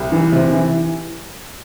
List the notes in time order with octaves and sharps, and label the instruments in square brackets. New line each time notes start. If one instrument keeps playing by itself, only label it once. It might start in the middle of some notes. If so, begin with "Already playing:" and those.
Already playing: [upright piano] C2
E3
C3
E3